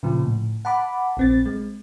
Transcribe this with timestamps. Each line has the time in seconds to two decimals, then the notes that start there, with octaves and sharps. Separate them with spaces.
0.03 A#2 C#3 F3
0.24 A2
0.65 F#5 A5 B5 D6
1.17 A#1 C4 A6
1.46 G#3